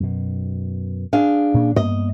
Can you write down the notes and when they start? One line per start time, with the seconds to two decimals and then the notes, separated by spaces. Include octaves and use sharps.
0.01 F#2 B2
1.13 D4 G#4 F5
1.54 A#2 A#3 C#4
1.76 G2 A#3 B3 D#5